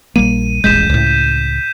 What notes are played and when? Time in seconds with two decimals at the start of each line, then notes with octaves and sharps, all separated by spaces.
0.16 A#1 G3 A#3 D#7
0.64 D#1 A1 G#3 G6 B6 E7
0.90 C#2 A2